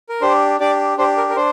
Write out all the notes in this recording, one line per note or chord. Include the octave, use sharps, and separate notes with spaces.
A#4
D4 G4 C5
D4 G4 D5
D4 G4 C5
A#4
A#4
D4 C5